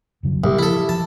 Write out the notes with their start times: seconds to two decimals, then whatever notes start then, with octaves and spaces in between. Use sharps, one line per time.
0.23 F1 C#3 F#3
0.44 C2 A#2
0.59 F3 E4 A4
0.89 F3 A5